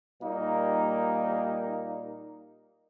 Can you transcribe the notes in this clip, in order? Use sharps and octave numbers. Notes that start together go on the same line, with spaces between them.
A#2 G3 A#3 D#4